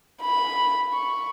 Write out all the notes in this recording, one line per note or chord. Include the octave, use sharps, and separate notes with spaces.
B5
C#6